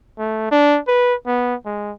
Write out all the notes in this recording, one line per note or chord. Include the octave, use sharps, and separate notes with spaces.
A3
D4
B4
B3
G#3